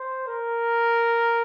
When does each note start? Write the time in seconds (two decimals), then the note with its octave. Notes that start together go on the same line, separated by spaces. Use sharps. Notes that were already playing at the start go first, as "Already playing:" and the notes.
Already playing: C5
0.28 A#4